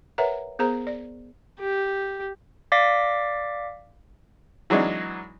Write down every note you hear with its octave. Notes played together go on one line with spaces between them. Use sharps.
A#4 B4 C#5 E5 F#5 A#5
B3 G#4 A#4 C5 A#5
D5
G4
D5 F5 D6 A#6 B6
E3 F#3 G#3 D4 D#4